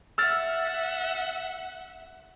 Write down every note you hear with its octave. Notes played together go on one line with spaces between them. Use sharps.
E5 F#5 E6 F6 A6